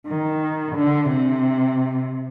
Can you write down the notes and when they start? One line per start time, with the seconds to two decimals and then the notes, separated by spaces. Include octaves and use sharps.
0.08 D#3
0.76 D3
1.09 C3